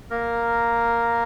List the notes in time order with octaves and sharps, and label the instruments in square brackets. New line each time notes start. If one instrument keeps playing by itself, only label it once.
[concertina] A#3 A#4